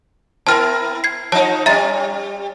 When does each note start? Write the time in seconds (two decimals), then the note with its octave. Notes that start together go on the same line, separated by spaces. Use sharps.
0.47 B3 E4 A#4 A5 F6
1.04 G#6 C7
1.32 F3 D#4 C#5 A5
1.66 G3 C#4 E5 A#5 A6